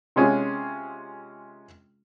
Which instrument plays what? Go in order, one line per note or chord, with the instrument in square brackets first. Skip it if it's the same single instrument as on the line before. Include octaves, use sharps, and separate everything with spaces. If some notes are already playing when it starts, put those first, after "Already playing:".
[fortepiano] C3 G#3 C#4 F4 G#4